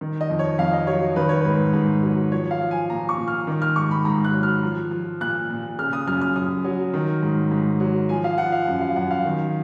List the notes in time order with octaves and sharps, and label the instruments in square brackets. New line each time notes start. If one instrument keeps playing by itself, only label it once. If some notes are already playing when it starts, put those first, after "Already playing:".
[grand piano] D#3
D#5
F2
C#5
F2 F5
D#5
F#3 C#5
D#3 B4
C#5
G#2 B4
G#2
F#3
F3 C#5
F5
F3
G#5
A#2 A#5
C#6
A#2
F6
D#3
F6
G#2 C#6
B5
G#2 A#5
F#6
F#3
F6
F3
F3
A#2 F#6
A#2
C#3 F6
D#6
F#2 F6
F6
F#2 D#6
F#3
D#3
G#2
G#2
F#3
F3 G#5
F5
F3 F#5
F5
F#2
F5
F#2 F#5
F5
D#3